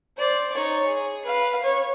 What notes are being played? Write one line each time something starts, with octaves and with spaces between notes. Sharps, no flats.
C5 D5
D#4 C#5
G#4
B4 F5
C#5